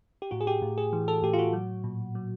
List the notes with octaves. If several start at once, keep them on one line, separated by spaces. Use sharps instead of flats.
G4
A2 F#4
G#4
G4
A2
G#4
E3
A4
A2 G4
F4
F#4
F#3
A#2
F#3